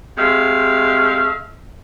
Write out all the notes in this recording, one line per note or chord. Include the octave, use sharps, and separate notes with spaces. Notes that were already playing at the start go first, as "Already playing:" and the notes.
C3 G#3 A3 E5 F5